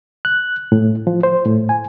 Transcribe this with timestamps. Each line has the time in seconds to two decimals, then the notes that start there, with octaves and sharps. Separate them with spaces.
0.25 F#6
0.72 A2
1.07 F3
1.23 C5
1.45 A2
1.69 G#5